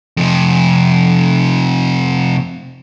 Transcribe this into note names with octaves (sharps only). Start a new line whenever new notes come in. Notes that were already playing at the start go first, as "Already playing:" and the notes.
F2 C3